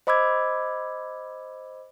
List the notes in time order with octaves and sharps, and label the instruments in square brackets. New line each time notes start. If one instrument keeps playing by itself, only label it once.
[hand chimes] C5 D#5 B5 D6 E6 G#6